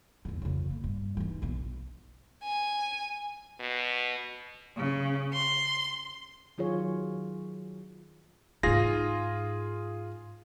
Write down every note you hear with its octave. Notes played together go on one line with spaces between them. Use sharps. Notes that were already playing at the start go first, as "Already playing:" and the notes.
E2 D3
F2 C#3
A#3
G2
E3 D#4
B1 D4
G#5
B2
C#3
C6
D#3 F#3 F4 G#4 C#5
G#2 D#4 F4 G#4 A#6